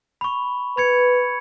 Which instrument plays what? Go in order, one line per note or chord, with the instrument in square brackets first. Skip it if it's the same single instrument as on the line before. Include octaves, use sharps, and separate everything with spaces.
[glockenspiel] B5 C#6
[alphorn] B4 [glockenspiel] B5 G#6 C#7